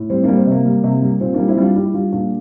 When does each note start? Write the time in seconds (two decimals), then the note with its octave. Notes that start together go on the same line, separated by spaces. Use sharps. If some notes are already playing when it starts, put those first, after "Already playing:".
Already playing: A2
0.10 G3 C4
0.24 G3 A#3 D4
0.37 C4
0.47 C3 A#3
0.65 G3
0.84 C3
1.02 G3
1.20 A#2 C4
1.34 G3 A#3 D4
1.48 C4 E4
1.58 G3 D4 F4
1.76 G3 E4 G4
1.94 G3 D4 F4
2.13 A#2 D4 F4